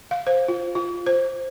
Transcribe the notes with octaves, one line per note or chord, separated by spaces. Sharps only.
F5
C5
F4
F4
C5